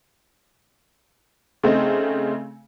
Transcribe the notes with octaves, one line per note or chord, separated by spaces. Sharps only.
C#3 A3 C4 D#4